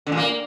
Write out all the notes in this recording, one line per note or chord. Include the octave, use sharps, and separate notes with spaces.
D3
A#2
A#3